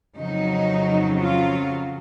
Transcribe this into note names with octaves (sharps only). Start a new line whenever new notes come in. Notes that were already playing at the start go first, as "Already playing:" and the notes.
F2 C#3 F#3 D#4
F4